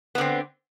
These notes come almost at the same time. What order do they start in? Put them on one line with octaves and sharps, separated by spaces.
B3 D3 C4